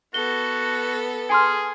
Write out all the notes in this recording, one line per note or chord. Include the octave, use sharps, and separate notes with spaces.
B3 F#4 A4 G7
G#4 G#5 C6 F6